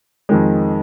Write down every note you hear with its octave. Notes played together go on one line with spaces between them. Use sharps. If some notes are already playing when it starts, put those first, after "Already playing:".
F2 D#3 G#3